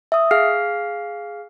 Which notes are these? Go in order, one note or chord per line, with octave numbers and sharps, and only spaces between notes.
E5 D#6
G#4 F5 F6 C7